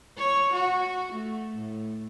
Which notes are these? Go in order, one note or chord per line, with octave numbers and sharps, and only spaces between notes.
C#5
F#4
A3
A2